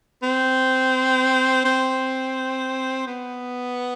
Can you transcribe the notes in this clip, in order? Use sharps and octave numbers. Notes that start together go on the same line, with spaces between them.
C4
C4
B3